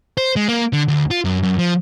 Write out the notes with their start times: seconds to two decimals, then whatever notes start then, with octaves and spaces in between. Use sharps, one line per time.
0.18 C5
0.36 G#3
0.48 A#3
0.73 D3
0.88 D2
1.11 F4
1.25 F#2
1.43 F#2
1.58 F3